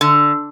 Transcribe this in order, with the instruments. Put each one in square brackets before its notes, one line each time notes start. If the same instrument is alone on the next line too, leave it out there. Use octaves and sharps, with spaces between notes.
[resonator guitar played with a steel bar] D3